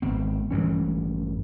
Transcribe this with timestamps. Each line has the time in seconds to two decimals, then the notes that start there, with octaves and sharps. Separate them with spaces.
0.02 G#1 B3 C4
0.51 A1 G2 E3 C#4